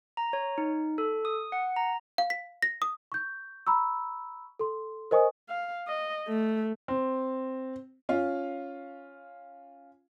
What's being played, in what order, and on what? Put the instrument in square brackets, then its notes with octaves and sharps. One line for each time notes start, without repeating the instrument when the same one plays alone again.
[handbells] A#5
C#5
D#4
A4
D#6
F#5
A#5
[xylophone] F5
B6
A#6
D#6
[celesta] C#6 G6
A#5 B5 C#6 E6
A4 C6
A#4 C5 D#5 G#5 C#6 D#6
[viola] F5
D#5
A3
[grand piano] C4
[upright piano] C#4 F4 F5